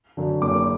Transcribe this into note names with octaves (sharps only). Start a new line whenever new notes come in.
F#2 D3
F#1 D6